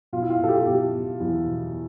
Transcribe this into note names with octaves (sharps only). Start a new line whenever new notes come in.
B2 F4
E4
F4
B2 A4
G4
B2 G4
B2
E2 E4
B2